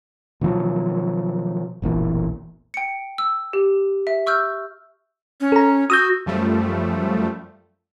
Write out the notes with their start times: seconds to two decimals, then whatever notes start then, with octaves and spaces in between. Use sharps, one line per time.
0.41 B2 D#3 F3 F#3
1.82 F#1 B1 A#2 E3
2.74 G5 C#7
3.18 E6
3.53 G4
4.07 E5
4.27 C#6 E6 F6 G6
5.41 C#4
5.52 A4 A#5
5.90 F#4 D#6 E6 G6
6.26 F#2 F3 G3 A3